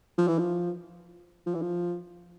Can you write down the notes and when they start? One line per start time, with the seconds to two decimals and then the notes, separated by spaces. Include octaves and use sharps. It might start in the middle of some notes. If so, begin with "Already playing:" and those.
0.18 F3
0.28 E3
0.39 F3
1.46 F3
1.55 E3
1.62 F3